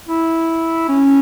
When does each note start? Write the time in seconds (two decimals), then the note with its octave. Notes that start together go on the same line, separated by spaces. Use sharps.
0.09 E4
0.89 C#4